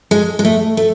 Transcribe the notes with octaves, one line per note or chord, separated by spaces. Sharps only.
G#3
G#3
A3
A3